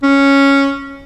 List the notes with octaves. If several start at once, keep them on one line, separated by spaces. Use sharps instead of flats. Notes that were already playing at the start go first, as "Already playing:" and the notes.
C#4